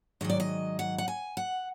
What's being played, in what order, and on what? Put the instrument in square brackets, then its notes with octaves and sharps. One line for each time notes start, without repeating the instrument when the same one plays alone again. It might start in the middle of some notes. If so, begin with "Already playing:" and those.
[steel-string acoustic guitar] G#2 D#3 F#3 D#5
D5
D#5
F#5
F#5
G#5
F#5